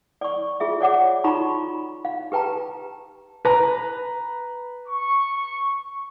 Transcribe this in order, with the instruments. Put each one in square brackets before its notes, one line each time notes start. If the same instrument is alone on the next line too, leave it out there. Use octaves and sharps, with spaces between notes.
[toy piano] D5 C#6
F4 G#4 E5
C#5 D5 F#5 D6
D#4 F4 F#4 A#5 B5 C#6
F5
G4 B4 G5 A5 A#5
[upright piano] B4 A#5
[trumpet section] C#6